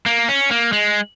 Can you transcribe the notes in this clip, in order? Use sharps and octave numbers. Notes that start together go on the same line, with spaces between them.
A#3
C#4
A#3
G#3